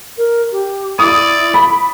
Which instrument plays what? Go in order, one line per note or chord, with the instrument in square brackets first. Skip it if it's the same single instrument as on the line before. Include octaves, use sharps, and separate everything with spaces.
[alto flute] A#4
G4
[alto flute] E4 [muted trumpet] D5 [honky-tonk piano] D#6
[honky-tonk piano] B5